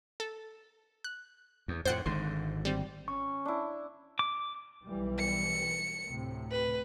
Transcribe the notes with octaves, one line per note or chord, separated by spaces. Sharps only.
A4
F#6
E2
F2 A2 C5 F#5 G5
G#1 G#2 D3 C6
G3 C4
C#4 C#6
D4 E4
D6
B1 E3 G3
C#7
D2 A2 C3
B4